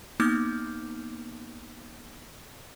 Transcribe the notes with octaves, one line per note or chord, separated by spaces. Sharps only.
A#3 B3 D#4 D6 F6 G6